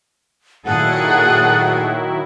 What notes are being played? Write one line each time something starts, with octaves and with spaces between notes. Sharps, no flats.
A#2 D#3 F#3 E4 G#4 A4 F#5